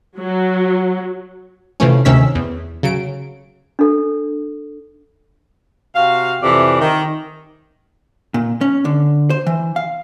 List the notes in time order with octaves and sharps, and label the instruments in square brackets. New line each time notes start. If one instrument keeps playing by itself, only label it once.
[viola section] F#3
[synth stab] C3 E3 F3 A3 C#4
D2 C3 D#3 C#4 E6 B6
E2
C#3 F#3 D7
[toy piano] D4 A4
[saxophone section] C3 F#4 F5
F2 C3 E3 D5
D#3
[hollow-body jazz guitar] A#2
C#4
D3
C5
E3
F5